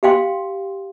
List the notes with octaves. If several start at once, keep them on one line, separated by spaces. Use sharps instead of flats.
G4 F5 G5 C6